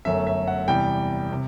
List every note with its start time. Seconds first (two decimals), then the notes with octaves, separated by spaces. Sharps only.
0.05 G1 F#2 F#3 A3 E5
0.27 E5
0.47 F#5
0.68 E2 C3 G3 G5
1.32 C3